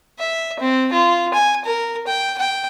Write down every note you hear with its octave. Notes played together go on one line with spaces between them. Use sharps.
E5
C4
F4
G#5
A#4
G5
G5